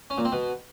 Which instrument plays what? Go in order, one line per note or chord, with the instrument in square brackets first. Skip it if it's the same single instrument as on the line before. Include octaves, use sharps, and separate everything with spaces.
[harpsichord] C#4
A#2
C4
B2